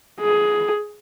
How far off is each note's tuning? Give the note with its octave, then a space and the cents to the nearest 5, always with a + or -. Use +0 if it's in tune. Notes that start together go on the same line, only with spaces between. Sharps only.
G#4 +10